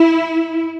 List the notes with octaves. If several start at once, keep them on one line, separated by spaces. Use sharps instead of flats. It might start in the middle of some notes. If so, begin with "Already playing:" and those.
Already playing: E4